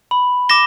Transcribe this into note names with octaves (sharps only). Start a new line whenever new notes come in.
B5
D6 A#6 E7 G7